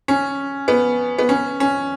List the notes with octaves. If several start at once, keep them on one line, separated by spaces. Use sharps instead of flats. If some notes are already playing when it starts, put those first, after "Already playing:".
C#4
B3
B3
C#4
C#4